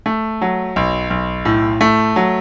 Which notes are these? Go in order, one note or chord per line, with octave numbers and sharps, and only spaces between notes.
A3
F#3
B1
B1
A2
A3
F#3